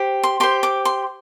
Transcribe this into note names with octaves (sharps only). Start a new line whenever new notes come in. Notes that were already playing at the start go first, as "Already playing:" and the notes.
Already playing: G4 C5
C6
G4 C5 C6
D6
C6